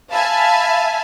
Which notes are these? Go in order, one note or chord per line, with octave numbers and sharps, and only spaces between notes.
E5 F5 G#5 A5 B5